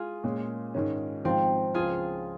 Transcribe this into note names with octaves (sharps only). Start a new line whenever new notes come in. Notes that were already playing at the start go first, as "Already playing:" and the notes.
Already playing: G#3 F4 G#4
A#2 G#3 C#4
G#2 D#3 G#3 C#4
G#1 G#2 F3 C4
C#2 C#3 F3 F4 G#4